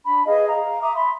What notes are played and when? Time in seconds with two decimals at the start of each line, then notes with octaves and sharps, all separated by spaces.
0.04 D4 B5
0.25 G#4 B4 D#5 F5
0.47 F5 A#5
0.81 E5 A#5 D6 D#6
0.93 B5 C6